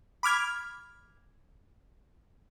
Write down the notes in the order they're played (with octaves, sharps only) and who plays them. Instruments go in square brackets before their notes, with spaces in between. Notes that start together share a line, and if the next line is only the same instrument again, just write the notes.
[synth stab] B5 D6 F6 G#6